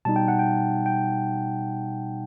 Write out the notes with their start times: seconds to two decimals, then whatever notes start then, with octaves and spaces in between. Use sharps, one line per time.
0.05 B2 G3 D#4 A5
0.16 G5
0.28 F#5
0.39 G5
0.86 G5